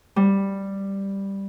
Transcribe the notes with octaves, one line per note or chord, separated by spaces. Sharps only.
G3